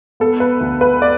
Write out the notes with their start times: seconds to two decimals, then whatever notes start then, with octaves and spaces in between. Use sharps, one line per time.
0.20 B3 A4
0.40 B4
0.61 D2
0.81 B4
1.02 D5